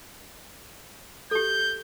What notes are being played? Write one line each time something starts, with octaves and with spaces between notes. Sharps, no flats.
G4 A4 G6